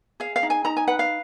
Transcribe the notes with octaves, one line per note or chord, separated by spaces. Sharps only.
G#4 F5
F5
D#4
G#5
D#4 A#5
G#5
B4 F#5
F5